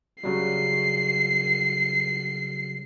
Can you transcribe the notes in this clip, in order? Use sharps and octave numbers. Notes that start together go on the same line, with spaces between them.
C#3 F#3 G3 C7